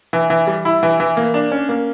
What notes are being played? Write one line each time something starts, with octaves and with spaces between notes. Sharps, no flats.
E3
E3
G3
E4
E3
E3
A#3
D4
C#4
A#3